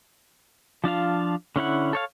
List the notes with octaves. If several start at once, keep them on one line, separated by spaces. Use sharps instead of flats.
F3 D4 F4 F5
D3 C#4 E4 F#5
A4 C#5 F5